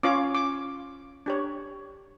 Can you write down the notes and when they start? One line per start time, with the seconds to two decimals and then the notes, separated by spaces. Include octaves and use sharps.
0.03 C#4 F4 C#5 D6
0.35 D6
1.26 D4 G4 C#5